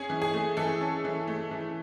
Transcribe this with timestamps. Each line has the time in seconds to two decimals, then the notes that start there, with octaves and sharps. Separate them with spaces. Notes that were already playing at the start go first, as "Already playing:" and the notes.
Already playing: C#4 G#4
0.10 E3
0.22 G#4
0.33 A3
0.57 E3 A4
0.81 C#4
1.05 E3
1.28 A3
1.51 E3